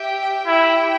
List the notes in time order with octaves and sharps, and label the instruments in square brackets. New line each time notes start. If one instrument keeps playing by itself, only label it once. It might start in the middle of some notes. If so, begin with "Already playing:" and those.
Already playing: [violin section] G4 E5 G5
[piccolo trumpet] E4 [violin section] G4 E5 G5